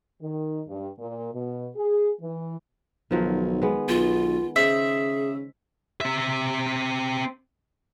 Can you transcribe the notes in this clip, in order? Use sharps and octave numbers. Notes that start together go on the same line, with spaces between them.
D#3
G2
A#2
B2
G#4
E3
B1 D#3 F3 F#3
G#3 B3
B1 F4
C#3 G#4 C5 D#5 E5
C4 E5